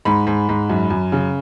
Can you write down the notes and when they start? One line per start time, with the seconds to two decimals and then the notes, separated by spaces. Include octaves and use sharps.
0.05 G#2 B5
0.27 G#2
0.49 G#2
0.69 F#2
0.90 F#2
1.12 C#3